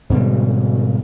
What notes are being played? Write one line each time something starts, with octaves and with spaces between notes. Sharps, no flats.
G#2 B2 D3 G3